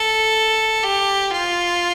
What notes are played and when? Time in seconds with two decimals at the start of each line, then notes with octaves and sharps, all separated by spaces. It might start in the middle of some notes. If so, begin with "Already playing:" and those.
Already playing: A4
0.83 G4
1.30 F4